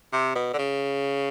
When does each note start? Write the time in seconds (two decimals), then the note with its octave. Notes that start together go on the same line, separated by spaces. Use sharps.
0.13 C3
0.35 B2
0.53 D3
0.58 C#3